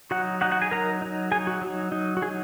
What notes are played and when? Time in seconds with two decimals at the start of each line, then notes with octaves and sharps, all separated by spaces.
0.11 F#3 D#4 F#4 F#5
0.41 F#3 D#4 F#4 F#5
0.52 F#4 F#5
0.62 G#4 G#5
0.71 F#3 D#4 A#4 A#5
1.02 F#3 D#4
1.32 F#3 D#4 G#4 G#5
1.47 F#4
1.62 F#3 D#4
1.92 F#3 D#4
2.17 F#4
2.22 F#3 G#4
2.26 D#4